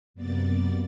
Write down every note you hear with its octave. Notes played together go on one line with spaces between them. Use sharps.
F#2 C3 A#3 B3 D5 A6